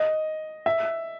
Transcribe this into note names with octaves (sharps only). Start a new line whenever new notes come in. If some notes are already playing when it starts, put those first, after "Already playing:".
Already playing: D#5
E5